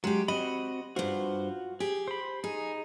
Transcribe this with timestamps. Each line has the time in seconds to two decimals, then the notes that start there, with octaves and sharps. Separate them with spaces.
0.04 F#3 G#3 G4
0.28 C4 F#4 D#5 B5
0.96 G2 F4 F#4 C5
1.80 G4 G#4
2.08 C5 B5
2.44 D#4 G#4